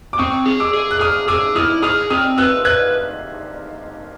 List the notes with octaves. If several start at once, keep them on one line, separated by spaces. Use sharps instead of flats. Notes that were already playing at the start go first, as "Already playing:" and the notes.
D6
C4 C#6 D#6
G#4
D6 E6
G#4
F#6
G#4 D#6 F6
G#4 D6 E6
E4 D#6 F6
G#4 D#6 F6
C4 D#6 F6
B4 E6 F#6
B4 F#6 G#6